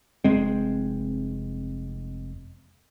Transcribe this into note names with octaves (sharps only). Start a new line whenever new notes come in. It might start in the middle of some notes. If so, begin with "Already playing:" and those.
F1 G#3 C4